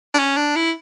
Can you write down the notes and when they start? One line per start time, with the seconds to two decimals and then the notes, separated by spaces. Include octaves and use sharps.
0.14 D4
0.19 C#4
0.37 D4
0.56 E4